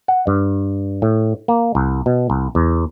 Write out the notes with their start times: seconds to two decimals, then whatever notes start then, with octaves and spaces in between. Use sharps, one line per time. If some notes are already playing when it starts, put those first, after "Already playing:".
0.08 F#5
0.27 G2
1.02 A2
1.48 A#3
1.75 C2
2.06 B2
2.30 C2
2.55 E2